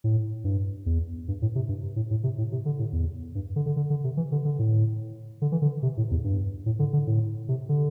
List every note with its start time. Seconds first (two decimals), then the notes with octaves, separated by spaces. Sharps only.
0.04 A2
0.44 G2
0.86 E2
1.28 G2
1.42 A2
1.55 C3
1.69 G2
1.96 A2
2.11 A2
2.24 C3
2.38 A2
2.52 C3
2.66 D3
2.79 A2
2.93 E2
3.35 G2
3.56 D3
3.66 D3
3.76 D3
3.90 D3
4.04 C3
4.17 E3
4.32 D3
4.45 D3
4.59 A2
5.42 D3
5.52 E3
5.62 D3
5.83 C3
5.97 A2
6.11 E2
6.24 G2
6.66 A2
6.79 D3
6.93 D3
7.07 A2
7.49 C3
7.69 D3